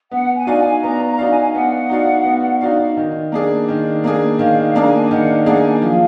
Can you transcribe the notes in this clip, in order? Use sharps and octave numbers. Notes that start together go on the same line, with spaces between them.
B3 F#5
G#5
D#4 F#4 D5 F5
G#5
B3 A#5
A#5
D#4 F#4 D5 F5
G#5
B3 F#5
D#4 F#4 D5 F5
B3
D#4 F#4 D5 F5
D#3
A#3 D4 G#4
D#3
A#3 D4 G#4
D#3 F5
F5
A#3 D4 G#4 A#5
G#5
G#5
D#3 F#5
A#3 D4 G#4 F#5
G#5
F3 F5